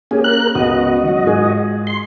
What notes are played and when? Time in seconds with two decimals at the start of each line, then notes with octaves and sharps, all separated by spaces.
0.11 A#3 C#4 G4 G#4
0.24 A#4 F#6
0.55 C#2 B3 F#4 D#5
1.03 D#3 F#3
1.24 G#2 F4 G#4
1.87 C6